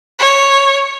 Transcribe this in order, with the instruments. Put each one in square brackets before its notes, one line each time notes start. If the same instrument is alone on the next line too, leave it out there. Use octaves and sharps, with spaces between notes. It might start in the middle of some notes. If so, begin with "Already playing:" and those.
[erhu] C#5